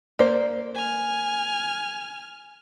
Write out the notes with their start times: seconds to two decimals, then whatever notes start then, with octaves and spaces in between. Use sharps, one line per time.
0.19 A#3 C5 D5
0.74 G#5 F6